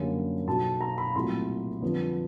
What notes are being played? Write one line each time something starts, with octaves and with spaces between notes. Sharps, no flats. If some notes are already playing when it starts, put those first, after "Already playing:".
Already playing: F#2 D3 G3 A#3 C#4
B1 B2 F#3 A5
A#5
B5
C2 A#2 F#3 A3 C6
F2 D3 G3 B3 D4